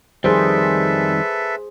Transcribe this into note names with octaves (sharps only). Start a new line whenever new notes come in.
F2 D#3 G3 G#4 A4 B4 C5 E5